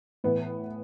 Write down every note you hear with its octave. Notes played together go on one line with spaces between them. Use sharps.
A2 E3 B3